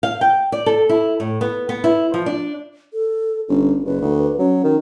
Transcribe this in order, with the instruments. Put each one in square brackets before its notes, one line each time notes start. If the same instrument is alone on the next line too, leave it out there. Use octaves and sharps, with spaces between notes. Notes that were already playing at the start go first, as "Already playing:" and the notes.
[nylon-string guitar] F5
G5
D5
A4
E4
A2
B3
B3
E4
F3
D4
[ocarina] A4
[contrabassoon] G1 [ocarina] C#4
[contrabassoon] F#1 [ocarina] B4
[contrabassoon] D2
[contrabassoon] F#3 [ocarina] C#4
[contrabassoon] D#3